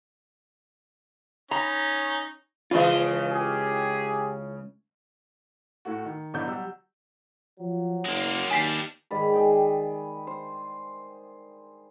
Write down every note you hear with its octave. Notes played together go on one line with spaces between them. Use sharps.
C#4 D#4 A#5
C#2 C#3 E3 F4 D#5
G4 G#4
A2 A3 F#4
D#3
B2 D3 F#3 E4 G6
F#3 G3 E6
F3 F#3
F#1 G#3 A#3
D#2 G3 G#5 A5 B6 C7
G#2 D#3 D5 B5
G#4 G5
C5